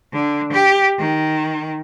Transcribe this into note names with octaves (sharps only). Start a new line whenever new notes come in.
D3
G4
D#3